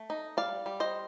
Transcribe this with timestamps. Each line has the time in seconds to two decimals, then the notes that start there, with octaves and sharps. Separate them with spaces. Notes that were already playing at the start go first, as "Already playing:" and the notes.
Already playing: A3
0.10 D#4
0.37 G3 D5 F5
0.66 G3
0.80 C5 D#5